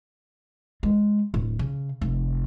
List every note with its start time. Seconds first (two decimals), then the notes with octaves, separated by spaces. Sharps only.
0.83 G#3
1.34 D1
1.59 C#3
2.01 F1